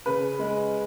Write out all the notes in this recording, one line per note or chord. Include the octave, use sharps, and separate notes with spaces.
C#3 B4
G#3